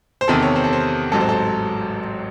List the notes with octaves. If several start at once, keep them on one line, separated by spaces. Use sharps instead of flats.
C5
E2 C3 D#3 A4
C#5
C5
A4
C5
A1 G#2 F#3 C4 A4
C5
A4